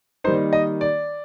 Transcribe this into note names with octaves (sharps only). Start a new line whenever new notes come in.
D#3 G3 A#3 D#4 C5
D#5
D5